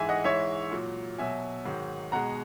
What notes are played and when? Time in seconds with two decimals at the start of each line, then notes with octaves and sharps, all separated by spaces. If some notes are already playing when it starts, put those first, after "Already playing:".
Already playing: G#2 E3 G#3 E5 G#5
0.09 D#5 F#5
0.24 G#2 E3 G#3 C#5 E5
0.71 A#2 F#3
1.18 B2 F#3 E5 G#5
1.65 G#2 D#3 F#3
2.12 B2 G#3 F#5 A#5